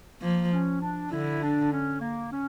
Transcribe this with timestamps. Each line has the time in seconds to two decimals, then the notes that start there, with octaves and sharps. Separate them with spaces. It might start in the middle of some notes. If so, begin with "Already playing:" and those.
0.21 F3 A#3
0.52 C#4
0.81 D4
1.11 D3 E4
1.42 D4
1.72 C#4
2.01 A#3
2.32 C#4